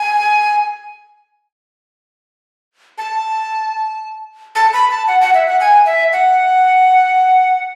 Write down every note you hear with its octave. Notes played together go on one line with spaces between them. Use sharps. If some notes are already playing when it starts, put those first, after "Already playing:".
Already playing: G#5
A5
A5
B5
A5
F#5
F#5
E5
F#5
G#5
E5
F#5